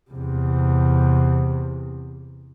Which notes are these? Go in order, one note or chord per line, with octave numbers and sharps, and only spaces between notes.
E2 C3